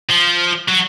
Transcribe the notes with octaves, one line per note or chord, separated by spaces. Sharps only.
F3
F#3